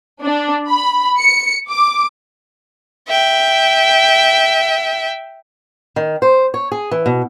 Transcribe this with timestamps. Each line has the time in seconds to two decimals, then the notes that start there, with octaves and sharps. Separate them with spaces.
0.22 D4
0.68 B5
1.18 C#7
1.70 D6
3.09 E5 G5
5.96 D#3
6.22 C5
6.54 C#5
6.72 G#4
6.91 E3
7.06 B2